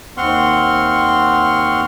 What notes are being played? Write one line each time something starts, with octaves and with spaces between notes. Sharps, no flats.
D#2 C4 F#5 C6 C#6 F6